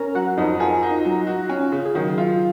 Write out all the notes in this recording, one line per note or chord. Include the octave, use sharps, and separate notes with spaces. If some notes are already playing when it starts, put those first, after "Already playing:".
Already playing: C#4 A#4 A#5
F#3 F#4 F#5
F2 D#4 D#5
F4 G#4
D#4
F#3
F#4
C#4
C#3
G#4
D#3 F#3 F#4
F4